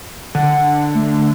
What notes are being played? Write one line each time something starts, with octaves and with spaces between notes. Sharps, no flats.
D3 F#5
A3